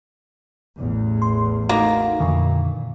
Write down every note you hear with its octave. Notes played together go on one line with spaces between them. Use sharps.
A1 E2
C6
A3 A#3 D#4 F#4
F2 A#2 D3 D#3